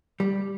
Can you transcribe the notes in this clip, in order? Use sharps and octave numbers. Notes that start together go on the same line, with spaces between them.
G3